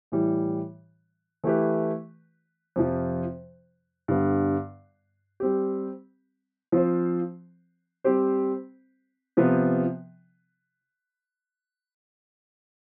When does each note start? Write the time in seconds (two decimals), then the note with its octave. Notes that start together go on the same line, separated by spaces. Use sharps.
0.12 A2 E3 G3
1.44 E3 A3 E4 G4 B4
2.76 F2 C3 F3
4.08 G2 D3 G3 B3
5.40 G3 C4 G4
6.72 F3 C4 F4 C5
8.04 G3 C4 G4 C5
9.37 C3 F3 B3